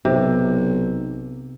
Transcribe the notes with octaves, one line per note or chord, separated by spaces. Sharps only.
B1 C3